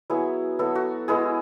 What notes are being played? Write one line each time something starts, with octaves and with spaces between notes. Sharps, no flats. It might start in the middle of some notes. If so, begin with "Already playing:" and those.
F#3 B3 E4 G#4
F#3 B3 E4 A4
F#4
G#3 B3 E4 G#4